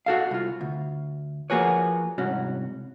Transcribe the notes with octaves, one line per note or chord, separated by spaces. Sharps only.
F#4 A4 F5
C2 F4
D2
F3 A#3 F#4 G#4 B4 C#5
C2 G#2 C#4 F#4